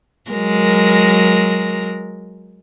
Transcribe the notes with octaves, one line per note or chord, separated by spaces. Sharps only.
F#3 G#3 A#4